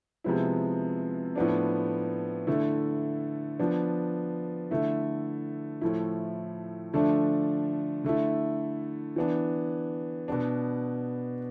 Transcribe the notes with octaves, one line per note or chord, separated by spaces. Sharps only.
C3 F3 G#3 B3 E4
A2 F3 B3 D4
D3 A3 E4
F3 B3 D4
D3 A3 E4
A2 F3 A3 E4
D3 F3 A3 D4
D3 A3 E4
E3 B3 D4
B2 B3 D4